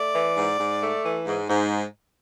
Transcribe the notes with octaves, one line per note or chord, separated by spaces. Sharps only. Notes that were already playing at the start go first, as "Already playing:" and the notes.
Already playing: A3 D5
E3
G#2
G#2
A3
E3
G#2
G#2